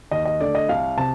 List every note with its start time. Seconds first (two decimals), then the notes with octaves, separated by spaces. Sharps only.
0.11 D#2 D#5
0.25 D#5
0.40 D3 A3 D5
0.55 D#5
0.69 C2 F5
0.98 C3 A5